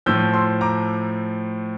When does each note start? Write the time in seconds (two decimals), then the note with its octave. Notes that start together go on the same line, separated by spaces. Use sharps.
0.06 A2 F3 E6 G6
0.33 C6 E6
0.61 A#5 D6